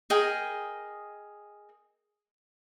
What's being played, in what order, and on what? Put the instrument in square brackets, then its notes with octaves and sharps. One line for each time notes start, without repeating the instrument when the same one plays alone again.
[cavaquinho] G#4 A#4 D#5 G5